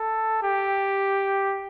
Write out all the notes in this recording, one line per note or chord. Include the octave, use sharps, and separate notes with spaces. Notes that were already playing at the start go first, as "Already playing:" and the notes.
Already playing: A4
G4